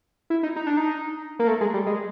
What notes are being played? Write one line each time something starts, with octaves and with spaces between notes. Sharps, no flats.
E4
D#4
D#4
D4
D#4
A#3
A3
G#3
G3
G#3